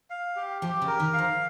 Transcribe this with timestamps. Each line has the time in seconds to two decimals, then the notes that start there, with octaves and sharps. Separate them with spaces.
0.10 F5
0.36 G4
0.62 F3 G4
0.82 C#3
0.87 A#4
1.00 D#3
1.13 F5
1.19 F3